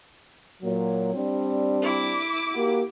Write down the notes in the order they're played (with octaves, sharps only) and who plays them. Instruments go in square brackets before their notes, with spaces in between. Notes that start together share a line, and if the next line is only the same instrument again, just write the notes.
[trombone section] A#2 F#3
G3 C4 D4
[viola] E4 D6
[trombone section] A#3 F#4 G4